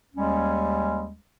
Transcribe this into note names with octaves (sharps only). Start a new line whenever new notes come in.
D#2 G3 G#3 C#4